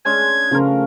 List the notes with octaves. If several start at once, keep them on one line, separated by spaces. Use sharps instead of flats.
G#3 C#4 D4 G#6
C#3 F3 A3 A#4